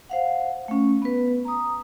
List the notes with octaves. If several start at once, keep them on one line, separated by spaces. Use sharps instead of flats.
C5 F5 F#5
A3 C#4
B3 B4
A#5 D#6